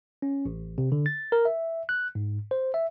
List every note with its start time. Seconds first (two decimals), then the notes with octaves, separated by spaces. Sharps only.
0.22 C#4
0.46 A1
0.78 C3
0.92 D3
1.06 A6
1.32 A#4
1.45 E5
1.89 F#6
2.15 G#2
2.51 C5
2.74 E5